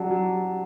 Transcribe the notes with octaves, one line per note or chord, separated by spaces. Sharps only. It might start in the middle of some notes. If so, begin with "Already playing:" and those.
Already playing: F#3 C#4 G4 D5 F#5 A5
F#3